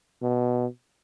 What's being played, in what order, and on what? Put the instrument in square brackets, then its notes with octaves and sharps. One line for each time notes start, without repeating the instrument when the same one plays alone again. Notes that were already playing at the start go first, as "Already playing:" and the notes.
[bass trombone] B2